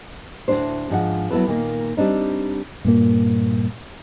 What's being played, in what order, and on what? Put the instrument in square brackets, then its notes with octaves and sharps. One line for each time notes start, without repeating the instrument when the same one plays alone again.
[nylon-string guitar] D2 A2 C3 F#3 D4 C5
G#2 F3 D4 F#5
F#3 B3 E4 A4 B4
A#2 D#3 A#3
G3 C4 D4 D#4
[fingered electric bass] G2 A#2 A#3